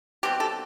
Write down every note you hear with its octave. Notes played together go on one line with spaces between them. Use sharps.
B2 G3 C4 G4
A4